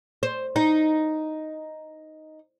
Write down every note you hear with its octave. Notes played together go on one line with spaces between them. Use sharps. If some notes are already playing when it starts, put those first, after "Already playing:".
C5
D#4